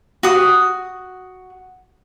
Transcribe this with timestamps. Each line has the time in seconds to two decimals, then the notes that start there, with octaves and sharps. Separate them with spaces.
0.23 F#4 D#6